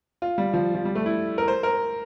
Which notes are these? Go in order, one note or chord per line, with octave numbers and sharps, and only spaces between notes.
F4
G3
F3
F3
G3
A3
E4
A#4
C5
A#4